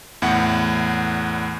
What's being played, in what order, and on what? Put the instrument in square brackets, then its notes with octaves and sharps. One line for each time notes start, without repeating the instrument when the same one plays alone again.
[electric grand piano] E2 A2 F#5